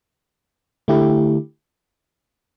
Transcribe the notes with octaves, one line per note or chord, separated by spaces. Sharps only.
D3 A3 E4 G4